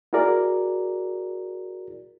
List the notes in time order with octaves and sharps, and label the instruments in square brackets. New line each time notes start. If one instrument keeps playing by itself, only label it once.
[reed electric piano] E4 F#4 G#4 A#4 D5